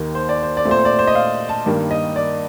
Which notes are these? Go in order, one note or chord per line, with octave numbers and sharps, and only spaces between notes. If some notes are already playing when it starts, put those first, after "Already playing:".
Already playing: D#2 D#3 A#3
C5
D5
C5
D5
A#2 A3 C4
C5
D5
C5
D#5
F5
A5
G2 D#3 G3 A#3
D#5
D5